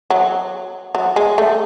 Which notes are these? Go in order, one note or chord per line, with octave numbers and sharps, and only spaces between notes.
F#3
F#3
G#3
A3